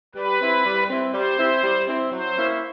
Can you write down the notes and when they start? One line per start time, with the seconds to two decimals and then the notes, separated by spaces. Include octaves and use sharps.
0.15 G3 B4
0.39 C4 E4
0.65 G3
0.89 C4 E4
1.13 G3 C5
1.38 C4 E4
1.63 G3
1.87 C4 E4
2.12 F#3 C5
2.37 A#3 C#4 E4